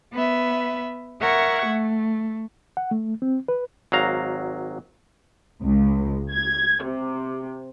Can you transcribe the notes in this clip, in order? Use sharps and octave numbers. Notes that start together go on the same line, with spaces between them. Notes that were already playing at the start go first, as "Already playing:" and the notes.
B3 B4 E5
A#4 E5 F#5 C#6 G#6
A3
F#5
A3
C4
B4
G#1 F#3 F5 A#5
C#2
G#6
C3